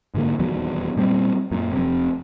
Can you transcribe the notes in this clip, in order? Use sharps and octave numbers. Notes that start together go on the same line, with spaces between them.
G#2 D3 A#3
D#1 E2 F#3 B3
A#2 G3 A3 C4
F#2 A#2
F1 C3